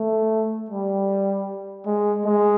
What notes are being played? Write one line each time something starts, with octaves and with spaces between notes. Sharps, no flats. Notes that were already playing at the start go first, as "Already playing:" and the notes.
Already playing: A3
G3
G#3
G#3